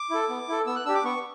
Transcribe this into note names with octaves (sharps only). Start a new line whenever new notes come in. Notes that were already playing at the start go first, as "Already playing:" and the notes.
Already playing: D6
E4 A4
B3
E4 A4
B3 E6
F#6
D4 G4 E6
D6
B3 C#6